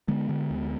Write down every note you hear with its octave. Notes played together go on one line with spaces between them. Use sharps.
D3 G#3 B3
D3
D2